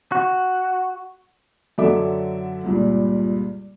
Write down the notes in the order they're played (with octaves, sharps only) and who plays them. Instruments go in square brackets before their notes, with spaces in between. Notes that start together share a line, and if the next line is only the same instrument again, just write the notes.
[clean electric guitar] F#4
[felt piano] F#2 D3 F#3 A4 E5 D6
C#2 G2 A#2